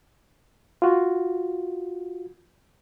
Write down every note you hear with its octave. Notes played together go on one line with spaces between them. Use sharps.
F4 F#4